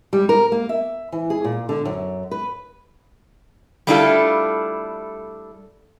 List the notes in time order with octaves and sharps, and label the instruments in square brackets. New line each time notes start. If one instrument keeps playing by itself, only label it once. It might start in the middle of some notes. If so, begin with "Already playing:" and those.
[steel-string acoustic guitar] G3
A#4
A#3
E5
E3
G#4
A#2
D3
F#2
B4
[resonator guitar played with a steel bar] G3 A3 D4 E4 F4 A4